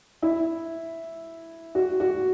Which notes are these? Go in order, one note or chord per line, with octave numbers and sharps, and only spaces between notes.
E4
F#4
F#4